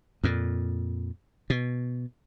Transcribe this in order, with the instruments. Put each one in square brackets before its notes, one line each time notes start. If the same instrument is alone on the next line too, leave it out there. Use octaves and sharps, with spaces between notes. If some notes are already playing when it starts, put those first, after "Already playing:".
[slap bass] F2 A#2
B2